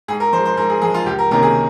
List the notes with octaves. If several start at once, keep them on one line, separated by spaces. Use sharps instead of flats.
G#2 G#4
A#4
F3 G#3 C5
C5
G#2 A#4
G#4
F3 G#3 G#4
F4
C#2 G4
A#4
C3 D#3 A#3 C#4 A#4
G#4